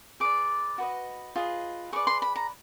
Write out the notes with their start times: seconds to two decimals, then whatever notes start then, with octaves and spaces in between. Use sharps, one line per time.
0.20 G#4 B4 D5 D6
0.78 F#4 B4 D#5
1.36 F4 G#4 B4 D#5
1.93 G#4 B4 D5 C#6
2.07 C6
2.22 B5
2.36 A#5